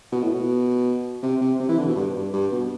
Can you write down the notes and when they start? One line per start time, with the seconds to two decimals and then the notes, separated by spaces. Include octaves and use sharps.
0.12 B2
0.23 A2
0.33 B2
1.22 C3
1.41 C3
1.60 C3
1.69 E3
1.78 D3
1.88 B2
1.96 G2
2.15 G2
2.33 G2
2.52 B2